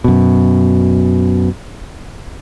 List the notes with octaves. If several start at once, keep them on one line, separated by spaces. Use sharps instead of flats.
F#2 B2